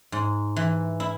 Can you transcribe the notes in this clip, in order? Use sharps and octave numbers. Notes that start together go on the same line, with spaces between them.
G#2
E3
E4